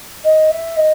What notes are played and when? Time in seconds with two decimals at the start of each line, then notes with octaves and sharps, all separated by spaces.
0.24 D#5
0.51 E5
0.77 D#5